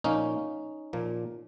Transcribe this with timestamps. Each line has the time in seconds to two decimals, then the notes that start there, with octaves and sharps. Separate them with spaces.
0.04 A#2 F3 A#3 C#4 D#4
0.93 A#2 F3 A#3